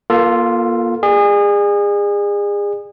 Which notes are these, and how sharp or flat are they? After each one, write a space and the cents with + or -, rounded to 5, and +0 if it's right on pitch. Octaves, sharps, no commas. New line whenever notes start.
A#3 +35 F4 +0 A4 +15
G#4 -30 D5 +35